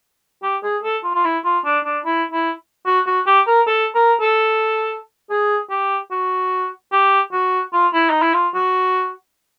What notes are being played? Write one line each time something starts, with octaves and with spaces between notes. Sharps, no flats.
G4
G#4
A4
F4
F4
E4
F4
D4
D4
E4
E4
F#4
F#4
G4
A#4
A4
A#4
A4
G#4
G4
F#4
G4
F#4
F4
E4
D#4
E4
F4
F#4